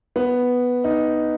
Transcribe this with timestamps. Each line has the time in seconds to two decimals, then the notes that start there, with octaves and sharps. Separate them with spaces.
0.16 B3
0.84 D#4